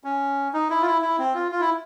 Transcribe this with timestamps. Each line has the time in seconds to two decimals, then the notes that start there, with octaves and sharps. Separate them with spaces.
0.04 C#4
0.53 D#4
0.70 E4
0.82 F4
0.86 E4
1.02 E4
1.19 C4
1.34 F4
1.52 F4
1.61 E4